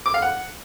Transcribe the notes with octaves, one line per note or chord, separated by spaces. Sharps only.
D6
F5
F#5